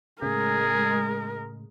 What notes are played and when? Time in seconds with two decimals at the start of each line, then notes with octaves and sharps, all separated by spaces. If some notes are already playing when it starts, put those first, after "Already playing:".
0.22 A2 C#3 G#3 G#4 A#4